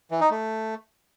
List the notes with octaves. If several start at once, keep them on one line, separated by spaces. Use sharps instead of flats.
E3
D#4
A3